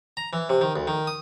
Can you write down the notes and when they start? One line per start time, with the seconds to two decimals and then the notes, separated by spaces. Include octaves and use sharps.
0.17 A#5
0.33 E3
0.49 C3
0.61 D#3
0.76 D2
0.87 D#3
1.07 D#6